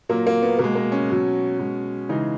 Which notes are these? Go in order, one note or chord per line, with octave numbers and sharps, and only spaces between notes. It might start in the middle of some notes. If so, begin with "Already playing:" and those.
A#2 F#3 A#3
A#3
B3
B2 A#3
G#3
A#3
C#4
B2 F#3
B2 G#3
C#3 E3 G#3 D#4